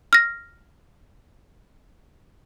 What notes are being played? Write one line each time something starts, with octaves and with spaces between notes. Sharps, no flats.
F6 A#6